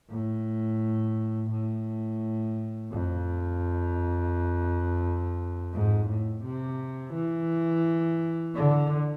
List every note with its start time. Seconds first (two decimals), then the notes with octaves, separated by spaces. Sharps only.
0.10 A2
1.51 A2
2.92 F2
5.73 G#2
6.09 A2
6.44 C3
7.14 E3
8.55 D3